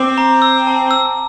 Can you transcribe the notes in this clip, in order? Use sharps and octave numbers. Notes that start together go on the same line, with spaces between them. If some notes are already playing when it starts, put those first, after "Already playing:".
Already playing: C4 D6
A#5
E6
A5
E6